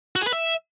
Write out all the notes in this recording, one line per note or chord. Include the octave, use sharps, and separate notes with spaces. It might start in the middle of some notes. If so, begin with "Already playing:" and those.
F#4
G#4
B4
E5